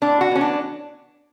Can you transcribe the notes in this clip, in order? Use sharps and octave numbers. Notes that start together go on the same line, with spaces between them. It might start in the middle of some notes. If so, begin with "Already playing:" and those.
A2 D4
F#4
E3 B3 C#4
D4